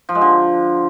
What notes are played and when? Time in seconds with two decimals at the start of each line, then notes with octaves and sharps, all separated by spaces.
0.09 F3
0.15 G#3
0.21 D3